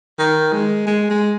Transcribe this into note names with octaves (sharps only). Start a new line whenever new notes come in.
D#3
G#3
G#3
G#3